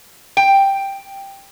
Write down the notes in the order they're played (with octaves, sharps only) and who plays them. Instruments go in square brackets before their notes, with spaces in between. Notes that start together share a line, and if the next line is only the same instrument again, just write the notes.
[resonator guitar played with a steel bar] G5